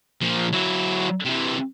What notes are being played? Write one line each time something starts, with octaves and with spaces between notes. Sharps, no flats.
A#2 F3
F#3 E4
C3 E3